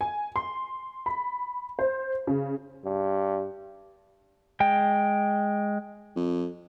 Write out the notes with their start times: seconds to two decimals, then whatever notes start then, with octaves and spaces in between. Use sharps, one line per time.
0.01 G#5
0.36 C6
1.06 B5
1.79 C5
2.27 C#3
2.85 G2
4.60 G#3 G5
6.16 F2